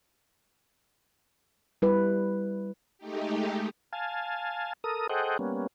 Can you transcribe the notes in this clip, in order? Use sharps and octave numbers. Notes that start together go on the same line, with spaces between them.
G3 E4 B4
G#3 A3 D#4 G4
F5 G#5 A5
A4 A#4 D#6
G#4 A4 C5 D#5 F#5 G5
G3 A#3 B3 C#4